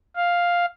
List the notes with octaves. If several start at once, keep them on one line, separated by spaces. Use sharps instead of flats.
F5